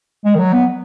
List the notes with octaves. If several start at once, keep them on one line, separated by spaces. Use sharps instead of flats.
G#3
D#3
F#3
B3